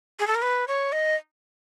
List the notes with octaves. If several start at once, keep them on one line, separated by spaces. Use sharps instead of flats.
G#4
A4
A#4
B4
C#5
D#5